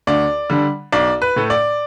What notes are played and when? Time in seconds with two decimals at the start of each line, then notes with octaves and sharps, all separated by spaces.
0.07 D2 D5
0.50 D3 G3 D4
0.93 B1 D5
1.22 B4
1.36 A2 A3
1.50 D5